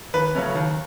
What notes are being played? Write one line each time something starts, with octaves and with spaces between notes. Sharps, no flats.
D#2 B4
C#3 F#3 A3 C#4
D#2